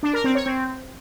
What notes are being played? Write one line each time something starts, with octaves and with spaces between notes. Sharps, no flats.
D4
A#4
C4
C#5
C4